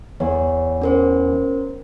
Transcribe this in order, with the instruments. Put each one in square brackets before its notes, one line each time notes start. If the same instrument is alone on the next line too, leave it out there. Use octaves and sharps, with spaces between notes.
[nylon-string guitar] E2 [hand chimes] C#5
[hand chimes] C#4 A#4 C5